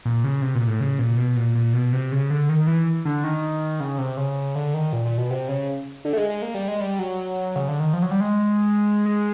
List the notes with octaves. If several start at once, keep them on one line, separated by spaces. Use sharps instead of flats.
A#2
C#3
C3
A#2
A2
C#3
A#2
B2
A#2
A#2
B2
C3
C#3
D3
D#3
E3
D3
D#3
C#3
C3
C#3
D3
D#3
A#2
A#2
B2
C3
C#3
D3
A3
G#3
G#3
A#3
G3
G#3
G3
F#3
C#3
D3
D#3
F3
F#3
G3
G#3
G#3